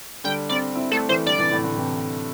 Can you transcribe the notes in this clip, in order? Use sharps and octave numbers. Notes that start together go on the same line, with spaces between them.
D3 G3 G5
G3 C4 D5
C4 E4
A3 D4 A4
E3 A3 C5
D3 G3 D5
C3 E3
A2 D3
A2 D3
C3 E3